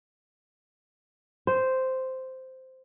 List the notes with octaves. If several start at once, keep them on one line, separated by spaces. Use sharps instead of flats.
C5